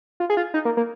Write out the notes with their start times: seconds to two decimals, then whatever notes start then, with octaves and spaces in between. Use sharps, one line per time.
0.20 F4
0.30 G#4
0.37 F4
0.54 D#4
0.65 A#3
0.77 A#3